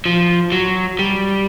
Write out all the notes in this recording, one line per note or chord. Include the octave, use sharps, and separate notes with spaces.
F3
F#3
G3